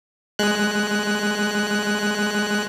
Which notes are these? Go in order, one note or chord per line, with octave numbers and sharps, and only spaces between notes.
G#3 F#6